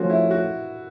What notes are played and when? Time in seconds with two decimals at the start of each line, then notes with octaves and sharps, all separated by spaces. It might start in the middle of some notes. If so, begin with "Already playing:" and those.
Already playing: F3 A3 C#4 F4 F#4
0.10 E4
0.31 F#4